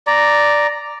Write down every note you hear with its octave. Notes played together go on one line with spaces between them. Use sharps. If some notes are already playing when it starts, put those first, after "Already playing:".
D5 A#5